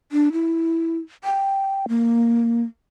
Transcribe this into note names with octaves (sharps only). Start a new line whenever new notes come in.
D4
E4
G5
A#3